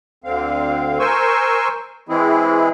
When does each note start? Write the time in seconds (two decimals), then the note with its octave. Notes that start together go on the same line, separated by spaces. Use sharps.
0.24 D2 D3 C4 F5
0.99 A#4 C5 G#5 C6 C#6 E6
2.09 E3 G#3 C4 E4 G#4